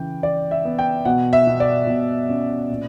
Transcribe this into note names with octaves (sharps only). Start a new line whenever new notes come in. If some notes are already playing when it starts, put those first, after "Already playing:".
Already playing: C#3 E3 G5
E3 D5
E5
B3
G5
B2 F#5
E5
B2
D5
B2
C#4
A#2